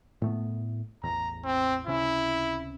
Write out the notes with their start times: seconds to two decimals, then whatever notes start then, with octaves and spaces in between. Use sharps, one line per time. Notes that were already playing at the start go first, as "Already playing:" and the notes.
0.22 A2 A3 B3
1.03 A1 E2 A#5
1.45 C4
1.87 C#2 C3 C#4 E4